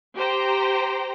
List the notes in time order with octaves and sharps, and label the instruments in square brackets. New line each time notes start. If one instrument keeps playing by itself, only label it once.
[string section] G4 C5 G5 A#5